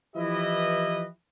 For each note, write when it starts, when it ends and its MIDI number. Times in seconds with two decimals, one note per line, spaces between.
0.16 1.05 52
0.16 1.05 53
0.16 1.05 64
0.16 1.05 67
0.16 1.05 71
0.16 1.05 75